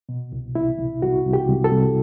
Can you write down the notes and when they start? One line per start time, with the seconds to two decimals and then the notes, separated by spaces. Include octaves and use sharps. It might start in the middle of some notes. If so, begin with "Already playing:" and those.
0.09 B2
0.32 C2
0.55 C2 E4
0.79 C2
1.02 C2 F#4
1.26 C2
1.33 G4
1.49 C2
1.64 A4
1.72 C2